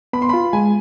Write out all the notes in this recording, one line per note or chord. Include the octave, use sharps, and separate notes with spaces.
B3 B5
C6
F4 B5
G#3 G#5